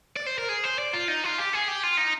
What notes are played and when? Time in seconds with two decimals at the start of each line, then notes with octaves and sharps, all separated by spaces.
0.16 D5
0.26 C5
0.38 A#4
0.49 G#4
0.64 C5
0.78 D5
0.93 F4
1.08 D#4
1.24 F4
1.38 G4
1.53 G#4
1.68 G4
1.84 F4
1.98 D#4